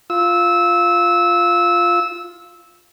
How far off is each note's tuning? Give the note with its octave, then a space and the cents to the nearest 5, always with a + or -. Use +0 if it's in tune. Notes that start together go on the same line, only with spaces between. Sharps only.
F4 -5 E6 -15